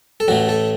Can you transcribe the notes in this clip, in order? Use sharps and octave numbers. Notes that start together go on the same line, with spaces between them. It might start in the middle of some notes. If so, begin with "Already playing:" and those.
A4
A1 A2 A3 F#4
A4